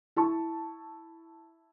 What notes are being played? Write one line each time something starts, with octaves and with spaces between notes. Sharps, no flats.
E4 A5 C#6